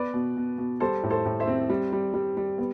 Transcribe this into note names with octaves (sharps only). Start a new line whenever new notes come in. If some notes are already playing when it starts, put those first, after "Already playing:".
Already playing: B3 B4 D5
B2
B2
B2
G3 A4 C5
A2
A4 C5
A2
C5 E5
C4
G3
G3
G3
G3
B3